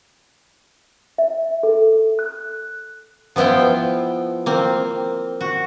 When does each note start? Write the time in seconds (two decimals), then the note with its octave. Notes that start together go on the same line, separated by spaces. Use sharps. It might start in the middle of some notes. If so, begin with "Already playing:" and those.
1.18 E5
1.63 A4
2.19 F#6
3.36 F3 B3 E4 F4 G5
4.46 A#3 C4
5.41 F#4